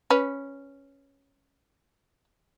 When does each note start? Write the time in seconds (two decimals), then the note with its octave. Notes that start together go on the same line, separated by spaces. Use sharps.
0.10 C#4 B4